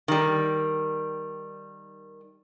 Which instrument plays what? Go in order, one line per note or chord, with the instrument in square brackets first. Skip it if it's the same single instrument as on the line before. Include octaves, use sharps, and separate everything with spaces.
[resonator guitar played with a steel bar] D#3 G3